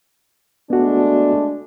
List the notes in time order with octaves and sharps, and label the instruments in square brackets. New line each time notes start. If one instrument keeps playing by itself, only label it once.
[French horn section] G#3 A3 D4 [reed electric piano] B3 F#4